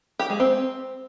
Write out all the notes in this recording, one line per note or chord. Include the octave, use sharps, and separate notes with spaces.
G4
G#3
C4